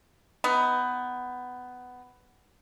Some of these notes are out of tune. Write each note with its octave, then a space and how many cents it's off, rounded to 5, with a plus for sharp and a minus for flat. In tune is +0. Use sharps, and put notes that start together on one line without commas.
B3 +15 D#4 +25